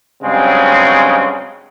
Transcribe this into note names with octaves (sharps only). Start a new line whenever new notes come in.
G2 C#3 F#3 G#3 C4